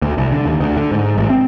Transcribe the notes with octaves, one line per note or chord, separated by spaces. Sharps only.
D2
C2
D3
D#2
D2
D3
G#2
A1
C4